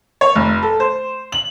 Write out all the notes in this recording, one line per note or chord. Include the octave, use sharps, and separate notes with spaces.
C#5
F1
A4
C5
F#7